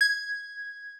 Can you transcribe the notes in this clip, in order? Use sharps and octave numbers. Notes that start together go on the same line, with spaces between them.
G#6